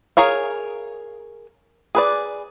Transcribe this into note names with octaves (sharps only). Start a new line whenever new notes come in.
G#4 A#4 C#5 F5
G#4 B4 D5